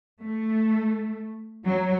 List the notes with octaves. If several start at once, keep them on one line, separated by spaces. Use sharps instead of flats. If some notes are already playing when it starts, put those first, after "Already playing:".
A3
F#3